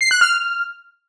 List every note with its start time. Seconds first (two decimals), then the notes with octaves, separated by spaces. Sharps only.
0.01 C7
0.11 F#6
0.21 F6